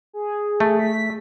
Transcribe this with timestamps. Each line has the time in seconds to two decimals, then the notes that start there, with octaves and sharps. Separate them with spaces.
0.13 G#4
0.60 A3
0.79 B6